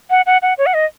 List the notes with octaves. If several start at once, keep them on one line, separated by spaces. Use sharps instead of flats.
F#5
F#5
F#5
C#5
F#5
D#5